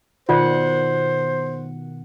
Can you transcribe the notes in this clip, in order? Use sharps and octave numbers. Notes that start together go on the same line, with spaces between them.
B2 D#3 F4 C5 D5 F#5